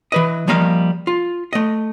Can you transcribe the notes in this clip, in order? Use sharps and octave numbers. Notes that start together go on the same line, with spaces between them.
E3 B4 D#5
F3 G3 A#3 D#5 F5
F4
A3 D#5